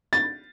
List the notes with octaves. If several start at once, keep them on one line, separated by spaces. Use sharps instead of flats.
A6